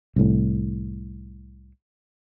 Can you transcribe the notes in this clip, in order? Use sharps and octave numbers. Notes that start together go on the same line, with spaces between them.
C2 A2